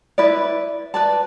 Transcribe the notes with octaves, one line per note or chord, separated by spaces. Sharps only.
E4 B4 D5
B4 D5 A5